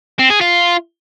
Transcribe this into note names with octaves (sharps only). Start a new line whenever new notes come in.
C4
G#4
F4